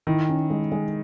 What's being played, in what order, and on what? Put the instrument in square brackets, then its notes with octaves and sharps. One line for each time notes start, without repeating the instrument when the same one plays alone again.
[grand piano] D#3 [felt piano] E4
[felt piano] C#4
G#3
G#3